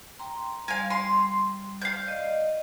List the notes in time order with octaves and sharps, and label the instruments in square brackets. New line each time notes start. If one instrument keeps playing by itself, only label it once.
[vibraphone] G5 A#5 C6
[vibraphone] G3 [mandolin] F5 G#5
[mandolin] C6
F5 G6
[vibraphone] D5 D#5